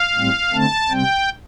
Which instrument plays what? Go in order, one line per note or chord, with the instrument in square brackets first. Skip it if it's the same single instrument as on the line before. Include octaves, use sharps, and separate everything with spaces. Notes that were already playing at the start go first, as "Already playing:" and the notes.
Already playing: [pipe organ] F5
A2 G3 C4
D3 A3 C4 A5
C3 G3 C4 G5